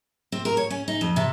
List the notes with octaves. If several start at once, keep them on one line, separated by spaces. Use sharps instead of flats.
C4
A#4
C#5
C#4
D#4
F2
C3